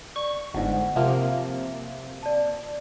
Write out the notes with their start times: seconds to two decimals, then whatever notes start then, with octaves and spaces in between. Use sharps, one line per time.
0.16 D5 C#6
0.54 G1 G#2 F#5
0.96 C3 F3 A#3 E5
2.23 D5 A5